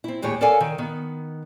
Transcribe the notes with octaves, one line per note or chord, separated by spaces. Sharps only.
C4 E4
D#2 A2 G4 G#4 C#5
A4 A#4 C#5 D5 F5 G#5
D#3
D#3 B3